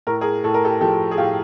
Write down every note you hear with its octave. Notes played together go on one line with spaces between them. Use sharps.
A2 A#4
G#4 A#4
A2 A4
A#4
G4 A4
F3 G4 A4
G#4
A2 F4 G4